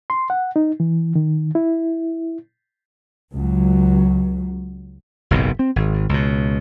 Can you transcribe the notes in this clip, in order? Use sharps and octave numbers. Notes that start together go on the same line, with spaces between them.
C6
F#5
D#4
E3
D#3
E4
C#2 F#3
F#1 B1 G#2 C3
C4
G#1
C#2 B2